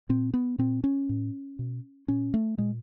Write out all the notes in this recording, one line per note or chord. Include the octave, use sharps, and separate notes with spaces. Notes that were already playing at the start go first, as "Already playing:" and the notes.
A#2 C4
B3
A#2 C4
C#4
A2
B2
A#2 C#4
A3
A#2 G#3